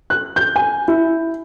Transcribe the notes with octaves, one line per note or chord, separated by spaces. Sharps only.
F#6
G6
G#5
E4